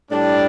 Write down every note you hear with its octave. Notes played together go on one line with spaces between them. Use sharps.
A2 G3 D4